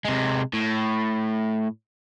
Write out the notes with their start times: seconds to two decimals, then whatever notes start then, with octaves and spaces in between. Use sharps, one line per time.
0.05 C3 G#3
0.53 A2